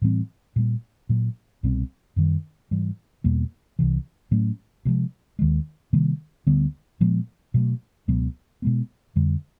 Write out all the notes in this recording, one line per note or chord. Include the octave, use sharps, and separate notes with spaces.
A2 E3 G3 C4
A#2 G3 A#3
A#2 F#3 A#3
C2 B2 G3 C4
F#2 D#3 G3
G#2 E3 G3
E2 B2 G3 A#3
C2 C3 E3
A2 F#3 A3 C#4
D2 C3 F3 G#3
D#2 D#3 G#3
C3 D#3 G3 A#3
D2 D3 G3 B3
A#2 F3 G#3 B3
B2 F#3 A3
C#2 B2 F#3 B3
B2 G#3 B3
F2 D3 G3